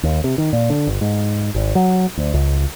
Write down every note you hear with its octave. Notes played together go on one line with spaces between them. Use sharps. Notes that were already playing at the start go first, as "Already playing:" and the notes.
D#2
C3
D#3
A#2
D3
G1
G#2
G#1
F#3
D2
C#2